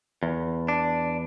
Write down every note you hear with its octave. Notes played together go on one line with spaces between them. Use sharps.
E2
D4